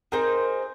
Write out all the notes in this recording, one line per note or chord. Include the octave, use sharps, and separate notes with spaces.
C4 D#4 G#4 A#4 C5